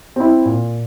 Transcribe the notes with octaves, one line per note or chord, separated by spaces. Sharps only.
C4 E4
A#2